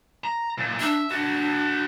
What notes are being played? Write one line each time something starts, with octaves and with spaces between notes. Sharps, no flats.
A#5
A#2 E3
D4 E5
D4 F#4 A4